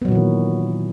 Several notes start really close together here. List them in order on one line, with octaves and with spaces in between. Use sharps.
B3 F#3 A#2 E3 D#3